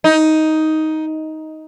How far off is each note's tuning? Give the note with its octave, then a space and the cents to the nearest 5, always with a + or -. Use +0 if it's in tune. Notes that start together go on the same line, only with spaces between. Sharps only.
D#4 +10